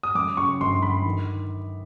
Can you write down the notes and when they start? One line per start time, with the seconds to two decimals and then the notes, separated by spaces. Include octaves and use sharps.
0.03 D#6
0.15 F#2 D6
0.37 C#3 C#6
0.61 G1 C6
0.82 G1 B5
1.06 D#3